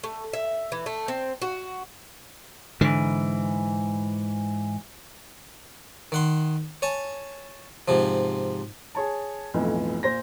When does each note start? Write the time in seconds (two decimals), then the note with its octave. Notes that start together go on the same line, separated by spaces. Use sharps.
0.03 A3
0.33 E5
0.72 E3
0.86 A3
1.08 C4
1.42 F#4
2.81 G#2 D3 E3
6.12 D#3 F#5 C6
6.82 C#5 G#5 A5
7.88 G#2 C3 F3
8.95 G#4 C#5 A5
9.54 B1 F2 A2 E3 F3
10.03 A#2 C5 A#6